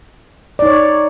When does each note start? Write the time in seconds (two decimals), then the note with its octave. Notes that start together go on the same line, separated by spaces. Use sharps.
0.59 D5
0.62 D#4
0.66 C#5